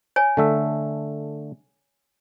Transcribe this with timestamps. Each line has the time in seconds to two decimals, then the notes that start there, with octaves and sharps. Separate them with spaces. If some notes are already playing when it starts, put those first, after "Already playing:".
0.16 C#5 G#5
0.37 D3 A3 E5